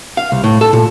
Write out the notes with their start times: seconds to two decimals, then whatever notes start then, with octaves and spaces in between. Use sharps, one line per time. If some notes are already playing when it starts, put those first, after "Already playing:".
0.17 F5
0.32 C2
0.44 A2
0.61 A4
0.73 A#2